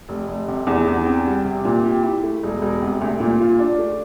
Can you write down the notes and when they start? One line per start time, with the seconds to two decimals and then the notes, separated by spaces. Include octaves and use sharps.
0.09 F1
0.28 F1
0.48 C3
0.67 E2
0.87 E2
1.06 C4
1.26 G3
1.45 C3
1.65 A#2
1.85 G4
2.03 E4
2.23 A3
2.43 E1
2.62 E1
2.82 C3
3.01 D2
3.20 A#2
3.40 F4
3.59 D4
3.78 A3